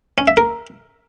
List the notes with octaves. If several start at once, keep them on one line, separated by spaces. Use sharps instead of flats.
C#4
E5
A#4